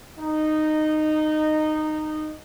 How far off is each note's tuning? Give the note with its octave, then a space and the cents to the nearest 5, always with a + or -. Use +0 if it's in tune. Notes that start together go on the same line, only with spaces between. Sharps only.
D#4 -15